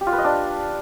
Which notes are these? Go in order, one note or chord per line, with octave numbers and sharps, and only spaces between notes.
G4
F4
B4
D#5
D4